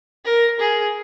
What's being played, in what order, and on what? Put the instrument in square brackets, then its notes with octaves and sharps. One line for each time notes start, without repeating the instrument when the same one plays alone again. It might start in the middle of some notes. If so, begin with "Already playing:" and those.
[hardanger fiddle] A#4
G#4